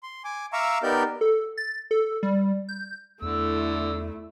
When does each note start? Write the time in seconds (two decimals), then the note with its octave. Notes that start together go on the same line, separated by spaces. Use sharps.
0.03 C6
0.24 G#5 D6
0.53 E5 F5 A#5 C#6 D6 E6
0.83 B3 D#4 G4 A#4 D5 G6
1.21 A4
1.57 A6
1.91 A4
2.23 G3
2.69 G6
3.22 E2 D3 A3 E4 E6